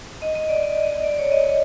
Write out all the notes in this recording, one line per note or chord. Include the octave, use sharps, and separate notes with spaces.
D#5
D#5
D5
D#5
D#5
D5
C#5
D#5
D#5